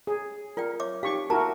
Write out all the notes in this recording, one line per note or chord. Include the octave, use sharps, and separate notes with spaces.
G#4
F4 A#4 D5 G5
C#5 E5 D6
D#4 G4 F5 C#6
E4 F#4 A#4 A5 A#5